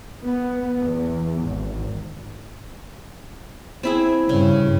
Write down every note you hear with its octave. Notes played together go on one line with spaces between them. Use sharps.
B3
E2
G#1
C4 E4 G#4
G2 C#3